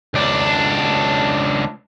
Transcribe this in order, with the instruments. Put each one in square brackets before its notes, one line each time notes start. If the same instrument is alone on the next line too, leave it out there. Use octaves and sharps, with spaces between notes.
[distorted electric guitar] C#2 D4